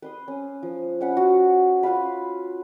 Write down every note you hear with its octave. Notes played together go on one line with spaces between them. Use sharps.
B4 C6 D#6
C#4
F3
C#4 F#5 B5
F#4
F4 B4 F5 B5